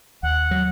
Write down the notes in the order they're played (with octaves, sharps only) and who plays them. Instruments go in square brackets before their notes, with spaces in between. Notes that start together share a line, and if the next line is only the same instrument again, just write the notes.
[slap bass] D#2 [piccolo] F#5
[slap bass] F#3